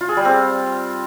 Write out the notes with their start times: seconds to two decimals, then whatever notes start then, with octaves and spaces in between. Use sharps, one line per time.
0.01 F4
0.09 G#4
0.17 G3
0.25 C4